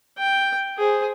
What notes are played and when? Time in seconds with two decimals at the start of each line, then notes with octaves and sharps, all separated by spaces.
0.19 G5
0.78 G#4 C5